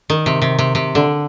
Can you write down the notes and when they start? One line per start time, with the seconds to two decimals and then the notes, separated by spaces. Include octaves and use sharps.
0.10 D#3
0.26 C3
0.42 C3
0.59 C3
0.75 C3
0.95 D3